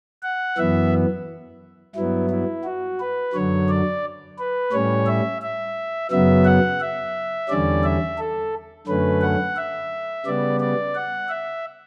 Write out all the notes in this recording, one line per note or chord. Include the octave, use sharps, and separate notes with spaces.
F#5
F#2 E3 B3 E5
G2 F#3 B3 E4
E4
F#4
B4
F#2 D3 F#3 C#5
D5
B4
A2 G3 C#4 C#5
E5
E5
F#2 C#3 F#3 B3 E5
F#5
E5
E2 D3 G3 C#4 D5
E5
A4
F#2 D3 A3 C#4 B4
F#5
E5
C#3 G3 B3 D5
D5
F#5
E5